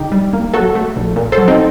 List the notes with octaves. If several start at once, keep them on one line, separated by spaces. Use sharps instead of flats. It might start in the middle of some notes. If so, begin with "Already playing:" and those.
Already playing: D3 D#4 G4
G3
A#3
F#3 F#4 A4
A3
A#1
A#2
A4 C5
F#3
C4 D#4